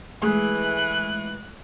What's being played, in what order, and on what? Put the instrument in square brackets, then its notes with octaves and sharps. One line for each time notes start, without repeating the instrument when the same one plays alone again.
[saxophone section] E3 [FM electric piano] G#3 A3 [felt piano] G#4 [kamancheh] F#6